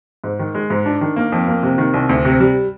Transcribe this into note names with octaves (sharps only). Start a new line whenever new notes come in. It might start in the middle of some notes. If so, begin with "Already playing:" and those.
G#2
D#3
G#3
G#2
D4
D#3
A#3
F2
A#3
C3
D#3
C2
D2
C3
G3